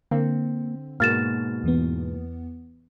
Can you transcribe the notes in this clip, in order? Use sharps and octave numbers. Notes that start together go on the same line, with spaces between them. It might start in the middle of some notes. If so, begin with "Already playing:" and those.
D3 A#3 C4
G#2 B2 A#3 F#4 F6 A6 E7
E2 E3 B3